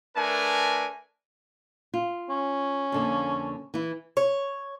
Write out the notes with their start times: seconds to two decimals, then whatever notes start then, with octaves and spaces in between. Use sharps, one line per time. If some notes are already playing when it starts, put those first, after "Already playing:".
0.17 A3 D4 A#4 B4 G#5
1.94 F4
2.29 C#4
2.92 F2 D3 A#3
3.74 E3 E4
4.17 C#5